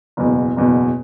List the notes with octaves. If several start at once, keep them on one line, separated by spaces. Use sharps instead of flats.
F#1 E2 B2
F#1 E2 B2